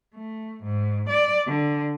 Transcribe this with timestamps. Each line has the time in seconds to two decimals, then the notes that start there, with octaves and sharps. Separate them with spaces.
0.14 A3
0.64 G#2
1.09 D5
1.46 D3